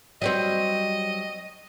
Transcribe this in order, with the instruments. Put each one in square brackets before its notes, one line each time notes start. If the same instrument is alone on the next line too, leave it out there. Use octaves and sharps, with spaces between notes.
[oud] F#3 G3 C4 [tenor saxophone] D#5